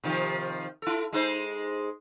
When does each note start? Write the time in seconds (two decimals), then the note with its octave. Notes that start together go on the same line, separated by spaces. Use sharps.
0.04 C3 D#3 F3
0.82 E4 A4
1.13 G#3 D#4 C5